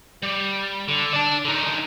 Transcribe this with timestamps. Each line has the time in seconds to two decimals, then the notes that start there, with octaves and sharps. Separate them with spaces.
0.22 G3
0.88 D3
1.13 D5 A5
1.45 D3 D#4